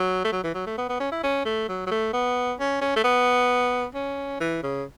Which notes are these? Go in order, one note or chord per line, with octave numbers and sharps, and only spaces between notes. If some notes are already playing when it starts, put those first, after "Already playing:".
Already playing: F#3
A3
F#3
E3
F#3
A3
B3
B3
C#4
E4
C#4
A3
F#3
F#3
A3
B3
C#4
C#4
A3
B3
C#4
E3
C#3